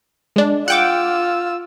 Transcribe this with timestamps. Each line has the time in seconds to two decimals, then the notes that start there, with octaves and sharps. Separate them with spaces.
0.36 G#3 D4
0.68 F4 F#5 G5 D6 E6